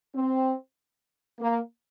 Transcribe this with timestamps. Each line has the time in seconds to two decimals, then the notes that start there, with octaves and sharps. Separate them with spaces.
0.15 C4
1.40 A#3